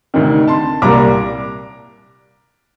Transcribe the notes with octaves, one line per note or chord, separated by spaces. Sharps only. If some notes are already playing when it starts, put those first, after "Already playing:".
D2 C3 D#3
A5 C6
C2 A#2 G3 A#5 D6